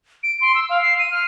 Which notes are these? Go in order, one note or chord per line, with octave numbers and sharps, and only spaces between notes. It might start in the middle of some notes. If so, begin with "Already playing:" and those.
D7
C6
E6
F5
C7
D#7
F6